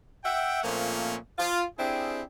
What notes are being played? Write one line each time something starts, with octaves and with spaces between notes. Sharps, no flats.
E5 F#5 G5
A#2 F3 A3 A#3 C4 C#4
F4
C4 D4 E4 G4 G#4